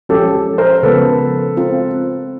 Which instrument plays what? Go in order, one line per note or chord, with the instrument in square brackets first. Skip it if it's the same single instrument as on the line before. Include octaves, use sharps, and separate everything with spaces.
[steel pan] F3 G#3 C#4 F#4 [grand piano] G4 A4
[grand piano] A#4 C5
[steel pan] C#3 F3 G#3 B3 [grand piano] A4 B4
[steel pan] G#3 C4 F4 A#4